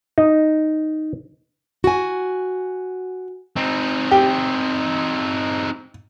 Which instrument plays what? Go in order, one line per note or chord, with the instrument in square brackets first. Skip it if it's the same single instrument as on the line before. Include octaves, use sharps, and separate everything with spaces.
[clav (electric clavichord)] D#4
[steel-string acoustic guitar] F#4 G#5
[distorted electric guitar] C4 D#4
[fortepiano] G4